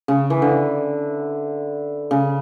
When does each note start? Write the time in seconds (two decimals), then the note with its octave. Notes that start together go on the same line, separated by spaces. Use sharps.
0.08 C#3
0.30 E3
0.42 D3
2.11 C#3